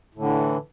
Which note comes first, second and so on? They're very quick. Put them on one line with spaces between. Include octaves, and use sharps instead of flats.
A2 D3 E3